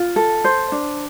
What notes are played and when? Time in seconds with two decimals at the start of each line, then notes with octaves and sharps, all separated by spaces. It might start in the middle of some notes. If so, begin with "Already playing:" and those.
Already playing: F4
0.16 A4
0.44 C5
0.72 D4